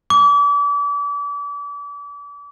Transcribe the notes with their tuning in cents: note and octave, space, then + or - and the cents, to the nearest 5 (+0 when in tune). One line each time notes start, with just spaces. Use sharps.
D6 -35